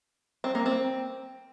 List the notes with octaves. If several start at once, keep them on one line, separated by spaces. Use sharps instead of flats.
C4
A#3
C4